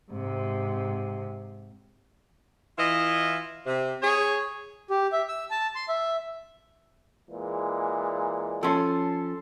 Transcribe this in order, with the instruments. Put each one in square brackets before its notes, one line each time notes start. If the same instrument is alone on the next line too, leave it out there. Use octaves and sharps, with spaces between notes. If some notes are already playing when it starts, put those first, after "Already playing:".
[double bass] G#2 C3
[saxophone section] E3 E4 F4 D#5
C3
G#4 C#5
[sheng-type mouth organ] G4
E5
E6
A5
C6
E5
[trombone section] A#2 E3 G#3
[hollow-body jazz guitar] F3 C#4 [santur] A4 C6